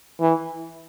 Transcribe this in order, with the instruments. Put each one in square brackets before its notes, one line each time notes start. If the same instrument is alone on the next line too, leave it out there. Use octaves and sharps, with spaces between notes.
[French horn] E3